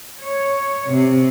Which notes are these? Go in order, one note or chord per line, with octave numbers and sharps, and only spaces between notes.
C#5
C3